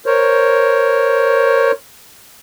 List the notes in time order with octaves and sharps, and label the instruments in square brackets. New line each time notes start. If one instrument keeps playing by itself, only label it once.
[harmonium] A#4 C5 C#5